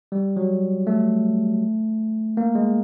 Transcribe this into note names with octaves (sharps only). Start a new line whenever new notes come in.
G3
F#3
A3
A#3
G#3